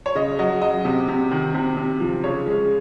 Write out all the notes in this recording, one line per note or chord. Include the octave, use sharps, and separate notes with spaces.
C#5
C#3 D#5
F#3 D#5
F#3 D#5
C3
C3
D#3
C3
C3
F3
C#3 C#5
G#3